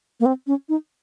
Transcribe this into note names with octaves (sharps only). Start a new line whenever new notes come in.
A#3
C4
C#4
D#4